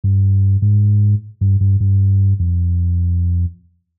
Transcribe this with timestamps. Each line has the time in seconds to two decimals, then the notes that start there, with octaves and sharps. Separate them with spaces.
0.04 G2
0.62 G#2
1.41 G2
1.60 G2
1.80 G2
2.39 F2